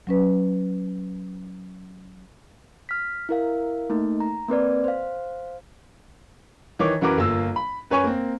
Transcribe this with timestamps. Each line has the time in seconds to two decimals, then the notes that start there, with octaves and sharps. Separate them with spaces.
0.07 F#3 C#4 B4
2.89 F6 B6
3.29 E4 A#4 F5
3.90 A3 A#3 D#4
4.20 A#5
4.48 A#3 C4 B4 D5
4.84 C5 F5
6.79 D#3 E3 C#5 D6
7.01 F#2 E3 F#4 A#4 B4 D6
7.17 G1 A#3 F4 E6
7.56 B5
7.91 F#2 B4 C#5 G#5 C#6
8.04 A#3 C4